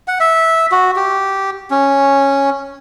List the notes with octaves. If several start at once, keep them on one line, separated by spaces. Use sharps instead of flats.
F#5
E5
F#4
G4
C#4